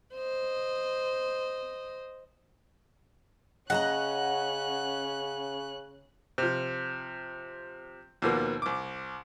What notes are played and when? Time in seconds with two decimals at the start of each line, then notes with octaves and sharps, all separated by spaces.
0.15 C5 D#5
3.70 C#3 C#4 D#5 F#5 A5 A#5 F#6
6.38 C3 F3
8.22 D#2 B2 F3 A#3 B3
8.62 C2 D6